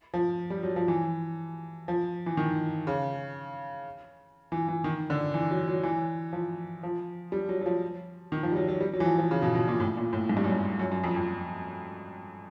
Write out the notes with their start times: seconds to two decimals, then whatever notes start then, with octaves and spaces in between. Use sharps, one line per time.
0.14 F3
0.50 G3
0.63 F#3
0.76 F3
0.88 E3
1.88 F3
2.26 E3
2.37 D#3
2.87 C#3
4.52 E3
4.68 E3
4.84 D#3
5.10 D3
5.34 E3
5.51 F#3
5.68 F#3
5.83 E3
6.33 F3
6.83 F3
7.32 G3
7.49 F#3
7.61 F#3
7.66 F3
8.32 D#3
8.43 F3
8.52 G3
8.56 F#3
8.68 F#3
8.81 G3
8.93 F#3
9.00 E3
9.06 F3
9.18 F3
9.31 C#3
9.42 B2
9.55 B2
9.68 A#2
9.80 A2
9.97 A#2
10.13 A2
10.29 G#2
10.37 G2
10.44 F#2
10.52 G2
10.79 F#2
10.92 F#2
11.04 F2
11.16 F2